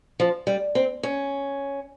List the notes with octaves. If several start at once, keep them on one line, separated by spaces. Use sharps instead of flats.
F3
G3
C4
C#4